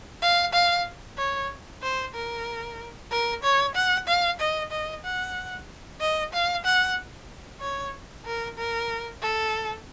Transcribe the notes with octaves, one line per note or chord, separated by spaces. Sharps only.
F5
F5
C#5
C5
A#4
A#4
C#5
F#5
F5
D#5
D#5
F#5
D#5
F5
F#5
C#5
A#4
A#4
A4